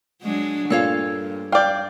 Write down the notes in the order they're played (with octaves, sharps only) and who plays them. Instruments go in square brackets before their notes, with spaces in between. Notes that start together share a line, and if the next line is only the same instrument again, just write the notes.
[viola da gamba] F#3 G#3 D4
[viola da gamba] G2 [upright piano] A#2 [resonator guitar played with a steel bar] A4 C#5 F5
[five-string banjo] D5 F5 [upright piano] G5 G6